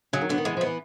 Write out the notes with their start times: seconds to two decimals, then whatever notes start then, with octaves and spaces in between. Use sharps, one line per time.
0.13 C#3 F#3
0.21 D#3
0.29 D3 B3
0.38 D#3
0.45 E3 G#3
0.57 F3
0.61 B3
0.66 E3